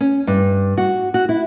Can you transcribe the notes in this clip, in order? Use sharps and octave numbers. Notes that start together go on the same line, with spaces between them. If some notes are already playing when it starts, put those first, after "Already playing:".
C#4
G2
F#4
F#4
E4